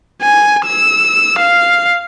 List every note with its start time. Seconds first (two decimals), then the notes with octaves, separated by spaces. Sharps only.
0.22 G#5
0.66 E6
1.39 F5